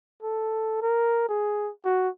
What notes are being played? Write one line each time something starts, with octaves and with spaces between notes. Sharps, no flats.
A4
A#4
G#4
F#4